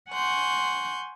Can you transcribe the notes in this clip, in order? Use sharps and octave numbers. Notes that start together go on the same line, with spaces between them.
F#5 G#5 C6 C#6 G6